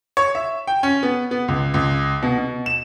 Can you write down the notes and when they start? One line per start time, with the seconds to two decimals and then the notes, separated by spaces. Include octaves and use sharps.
0.17 C#5
0.35 E5
0.67 G5
0.83 C#4
1.03 B3
1.31 B3
1.48 C#2
1.74 C#2
2.23 B2
2.38 B2
2.66 E7